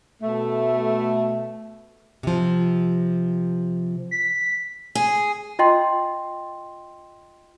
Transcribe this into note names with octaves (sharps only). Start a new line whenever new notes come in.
B2 A3
C3 F3
B6
G#4
F4 D#5 G5 C6